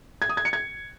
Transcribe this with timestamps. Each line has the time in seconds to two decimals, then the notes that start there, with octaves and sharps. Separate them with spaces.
0.22 G#6
0.29 D#6
0.37 G#6
0.45 C#7
0.53 G#6